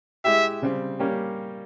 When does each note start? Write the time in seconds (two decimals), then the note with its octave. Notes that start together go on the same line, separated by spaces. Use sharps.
0.24 G#3 E4 G4 E5
0.62 C#3 G3 C4
0.99 G3 A#3 C#4 G4